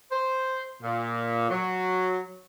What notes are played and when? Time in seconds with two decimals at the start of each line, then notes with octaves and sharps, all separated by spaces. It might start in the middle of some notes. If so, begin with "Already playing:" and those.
0.12 C5
0.82 A#2
1.50 F#3